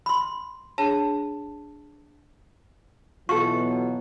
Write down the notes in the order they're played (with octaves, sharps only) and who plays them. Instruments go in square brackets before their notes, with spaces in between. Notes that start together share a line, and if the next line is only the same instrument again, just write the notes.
[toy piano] B5 C6
[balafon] D4 G#4 C#5 [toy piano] A5
[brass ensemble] B2 E3 F#3 [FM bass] F4 [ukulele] F#4 A4 [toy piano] C#6